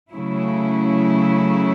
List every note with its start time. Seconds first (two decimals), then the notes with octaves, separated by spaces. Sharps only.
0.11 C#3 F#3 A3 E4